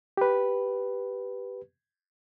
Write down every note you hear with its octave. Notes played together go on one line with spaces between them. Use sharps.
G4 B4